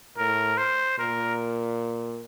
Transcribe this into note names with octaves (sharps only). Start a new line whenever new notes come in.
A2 A#4
C5
A#2 A#4